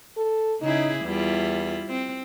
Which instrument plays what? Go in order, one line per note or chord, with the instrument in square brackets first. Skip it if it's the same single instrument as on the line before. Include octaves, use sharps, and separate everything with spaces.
[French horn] A4
[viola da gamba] C#3 E4 G#4 [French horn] D#4
[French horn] E2 [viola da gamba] G3 E4 F4
[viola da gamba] C4